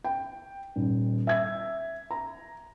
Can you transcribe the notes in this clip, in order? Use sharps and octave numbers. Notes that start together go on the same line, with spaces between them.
G5
D#1
E5 G#6
A#5